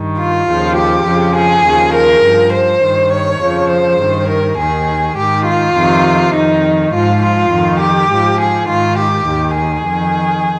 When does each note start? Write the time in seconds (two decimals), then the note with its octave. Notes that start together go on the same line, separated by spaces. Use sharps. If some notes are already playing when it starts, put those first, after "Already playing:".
Already playing: G2 D#3
0.19 F4
0.48 D#2 C#3 F3
0.77 G4
1.06 F2 C#3 F3
1.35 G#4
1.65 D#2 C#3 F3
1.94 A#4
2.23 G2 F3
2.53 C5
2.82 G2 D#3
3.11 C#5
3.41 F2 C#3 F3
3.70 C5
3.99 G2 D#3
4.29 A#4
4.58 D#2 D#3 G#4
5.17 G#2 D#3 G4
5.46 F4
5.75 F2 C3 D#3
6.34 F2 D#3 D#4
6.92 G#2 F3 F4
7.22 F4
7.51 F2 D#3
7.81 G4
8.10 G#2 F3
8.39 G#4
8.68 G#2 D#3 F4
8.98 G4
9.27 D#2 D#3
9.56 G#4
9.85 F2 D#3